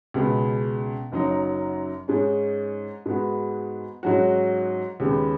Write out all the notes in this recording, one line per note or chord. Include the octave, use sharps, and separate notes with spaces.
C#2 B2 G#3 B3
F#1 F#2 F#3 D#4
G#2 G#3 C#4
G#2 G#3 B3 F#4
G#2 F#3 C#4 F#4
D#2 C#3 G#3 B3